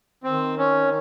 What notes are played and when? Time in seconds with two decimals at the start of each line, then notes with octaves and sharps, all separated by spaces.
0.23 D#3 C4
0.58 C#4